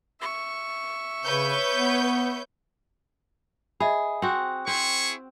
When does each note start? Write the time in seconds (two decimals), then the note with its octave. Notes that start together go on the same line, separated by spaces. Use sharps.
0.20 E5 C#6
1.24 C#3 B4 C#5 G6
1.75 B3
3.80 G#4 D#5 E5 B5
4.22 C4 F#4 G5
4.67 C4 E4 G#4 C#6